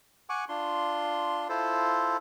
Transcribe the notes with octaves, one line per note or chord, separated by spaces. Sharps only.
F#5 G#5 C#6 D6
D4 F4 C6
E4 F4 A4 C5